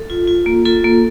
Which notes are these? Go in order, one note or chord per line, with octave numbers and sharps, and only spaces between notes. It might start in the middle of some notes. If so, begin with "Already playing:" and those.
Already playing: A4
F4
F4
A#3
F4 A4
A#3